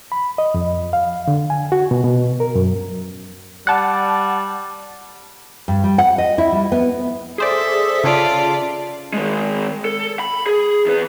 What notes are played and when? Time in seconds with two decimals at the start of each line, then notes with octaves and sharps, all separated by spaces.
0.12 B5
0.38 D#5
0.54 F2
0.93 F5
1.28 D3
1.50 G#5
1.72 F#4
1.91 B2
2.04 B2
2.40 A#4
2.55 F#2
3.67 G3 F#5 A5
5.68 G2
5.84 G3
5.98 F#5
6.18 D#5
6.38 E4
6.52 G3
6.72 B3
7.38 G#4 A4 C5 D5 E5 D#6
8.04 C#3 F4 D5 A5
9.13 D#3 G#3
9.85 A4
10.19 B5
10.47 G#4
10.86 E2 B4